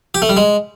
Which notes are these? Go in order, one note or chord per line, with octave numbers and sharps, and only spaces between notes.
G4
A3
G3
G#3